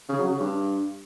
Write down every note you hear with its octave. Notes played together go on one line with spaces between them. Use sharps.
C#3
F#3
C#3
G2